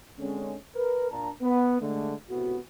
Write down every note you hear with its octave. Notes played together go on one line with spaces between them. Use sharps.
D3 G#3 C4 C#4
A#4 B4
A#2 D4 A5 A#5
B3
D3 G#3 A3
C#2 A2 C3 B3 F#4